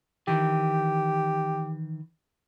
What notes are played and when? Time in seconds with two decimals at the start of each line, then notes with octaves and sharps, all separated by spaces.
0.28 D#3 E3 G4